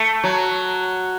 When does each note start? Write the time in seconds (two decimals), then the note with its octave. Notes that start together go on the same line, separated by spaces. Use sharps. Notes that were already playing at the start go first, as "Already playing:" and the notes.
Already playing: A3
0.24 F#3